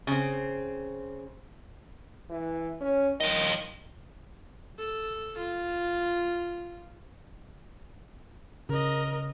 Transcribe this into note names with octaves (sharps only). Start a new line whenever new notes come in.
C#3 C4
E3
C#4
D#3 F3 D#5
A4
F4
C#3 A#4 D#5